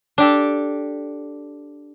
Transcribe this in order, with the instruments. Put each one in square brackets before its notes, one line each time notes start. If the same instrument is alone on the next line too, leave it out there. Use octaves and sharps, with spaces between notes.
[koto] D4 G4 A4